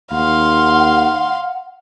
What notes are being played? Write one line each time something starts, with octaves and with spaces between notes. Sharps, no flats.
D#2 F5 F#5 C6